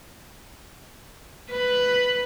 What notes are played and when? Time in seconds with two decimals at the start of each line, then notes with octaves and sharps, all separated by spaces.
1.51 B4